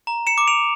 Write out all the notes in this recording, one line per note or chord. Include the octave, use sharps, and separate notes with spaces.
A#5
C#7 E7
D6
D7 F7